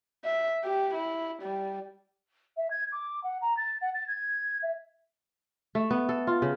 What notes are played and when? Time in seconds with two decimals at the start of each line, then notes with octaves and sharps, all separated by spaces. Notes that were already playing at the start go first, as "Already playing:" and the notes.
0.24 E5
0.64 G4
0.94 E4
1.42 G3
2.57 E5
2.70 G#6
2.92 D6
3.23 F#5
3.41 A#5
3.57 A6
3.81 F#5
3.94 A6
4.07 G#6
4.62 E5
5.75 A3
5.91 B3
6.09 A4
6.27 F4
6.42 C#3